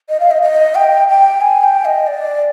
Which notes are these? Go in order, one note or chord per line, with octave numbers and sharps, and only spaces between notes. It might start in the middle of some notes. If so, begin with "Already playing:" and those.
D#5
F5
D#5
D#5
G5
G5
G#5
G5
D#5
D5